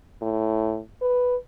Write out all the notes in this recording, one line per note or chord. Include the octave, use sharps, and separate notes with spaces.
A2
B4